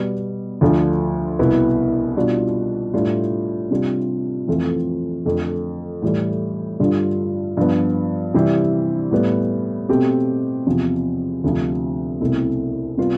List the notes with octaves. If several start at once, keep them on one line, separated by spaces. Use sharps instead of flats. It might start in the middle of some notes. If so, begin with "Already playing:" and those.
Already playing: B2 G3 B3
D2 D3 F3
C2 B2 B3 E4
B2 G3 D4 F4
A2 G3 D4 F4
C3 G3 D4 F4
F2 E3 A3 C4 F4
F2 D3 A3
A2 E3 G3
G2 D3 G3 D4 F4
G2 F3 B3
C3 E3 G3 C4 E4
A2 G3 B3
B2 A3 C4 G4
E2 C3 F3
D2 C3 F3
C2 B2 A3 C4 E4
C3 G3 B3 F4